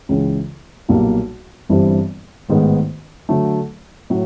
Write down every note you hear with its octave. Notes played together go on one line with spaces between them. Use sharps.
C#2 C#3 E3 G#3 C#4
B1 A#2 G3 A#3
G1 G2 E3 G3 C4
A1 G#2 D#3 G#3 B3
D3 F#3 A3
A2 F#3